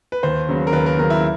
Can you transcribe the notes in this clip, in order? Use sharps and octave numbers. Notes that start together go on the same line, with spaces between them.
B4
D#2 C5
C#3 F#3 B3
A#4
D#2 B4
A#4
C#3 F#3 B3 A#4
E4